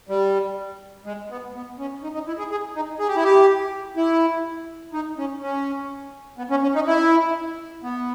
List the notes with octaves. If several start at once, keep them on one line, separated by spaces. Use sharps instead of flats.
G3
G#3
B3
B3
C#4
D#4
D#4
E4
G#4
G#4
D#4
G#4
G4
E4
G4
E4
D#4
C#4
C#4
B3
C#4
C#4
D#4
E4
B3